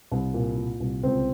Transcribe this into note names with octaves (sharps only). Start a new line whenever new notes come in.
C2
A#2
A#2
C2
C#2 C4